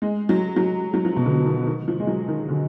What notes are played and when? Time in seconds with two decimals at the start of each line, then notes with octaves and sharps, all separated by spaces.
0.02 G#3
0.29 F#3
0.56 F#3
0.94 F#3
1.05 F3
1.16 B2
1.25 D3
1.46 D#3
1.66 D#3
1.88 F3
2.00 G#3
2.07 F#3
2.28 D#3
2.48 D3